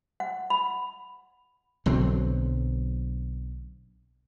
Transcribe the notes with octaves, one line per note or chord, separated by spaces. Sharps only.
F#5
B5
B1 D3 F#3 C4